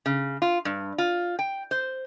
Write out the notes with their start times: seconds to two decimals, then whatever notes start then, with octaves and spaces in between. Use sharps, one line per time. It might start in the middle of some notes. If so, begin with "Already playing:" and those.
0.06 C#3
0.42 F4
0.65 G2
0.98 F4
1.39 G5
1.71 C5